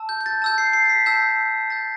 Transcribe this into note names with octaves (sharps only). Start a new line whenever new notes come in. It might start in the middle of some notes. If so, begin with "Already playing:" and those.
Already playing: A5 E6
G6
G6
A6
A5 E6 G6
C7
C7
A6
B6
A5 E6 G6
A5 E6 G6 A6